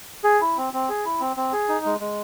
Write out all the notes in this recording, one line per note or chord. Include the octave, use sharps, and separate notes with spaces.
G#4
E4
C4
C4
G#4
E4
C4
C4
G#4
D#4
G#3
G#3